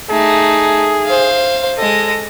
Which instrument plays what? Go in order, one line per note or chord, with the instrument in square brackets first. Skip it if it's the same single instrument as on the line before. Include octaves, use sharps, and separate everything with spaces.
[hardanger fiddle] A3 D#4 [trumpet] G#4
[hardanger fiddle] C5 F5
[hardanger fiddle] G#3 D#5 [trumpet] A4